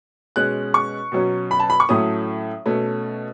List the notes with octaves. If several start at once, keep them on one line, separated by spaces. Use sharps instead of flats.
B2 G#3 C#4 F#6
C#6
B2 F#3 C#4
B5
A5
B5
C#6
A2 F#3 A3 C#4 D#6
B2 A3 C#4